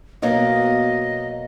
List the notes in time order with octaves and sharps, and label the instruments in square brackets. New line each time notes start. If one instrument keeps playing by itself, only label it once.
[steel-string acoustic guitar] B2 F#3 A#3 [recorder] D#5